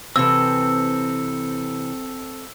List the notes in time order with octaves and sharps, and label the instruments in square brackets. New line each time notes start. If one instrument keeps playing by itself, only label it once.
[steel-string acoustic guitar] C3 E3 [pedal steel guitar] C4 A4 [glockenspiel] E6